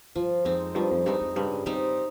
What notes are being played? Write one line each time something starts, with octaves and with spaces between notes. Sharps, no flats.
G2 F3
F2 G#3 C4 D#4
G2 F3
F2
G2 G#3 C4 D#4
F2
G2 C#3
G2 G3 C4 D#4